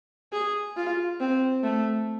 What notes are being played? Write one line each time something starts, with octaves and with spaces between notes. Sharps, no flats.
G#4
F4
C4
A3